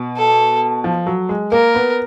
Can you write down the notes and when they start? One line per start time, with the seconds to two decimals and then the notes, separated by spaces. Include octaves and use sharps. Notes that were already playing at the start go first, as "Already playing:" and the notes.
Already playing: B2
0.17 A4
0.84 F3
1.07 F#3
1.29 G#3
1.52 A#3 A#4
1.75 B3